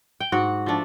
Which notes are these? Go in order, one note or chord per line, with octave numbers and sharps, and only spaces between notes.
G5
G#2 F#4 F#5
F3 A3 D4